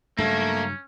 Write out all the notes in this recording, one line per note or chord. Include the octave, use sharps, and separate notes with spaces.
G2 C#3 F#3 A3 A#3 C#4